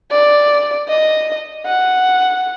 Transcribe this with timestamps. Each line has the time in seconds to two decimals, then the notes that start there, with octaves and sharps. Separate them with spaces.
0.11 D5
0.89 D#5
1.66 F#5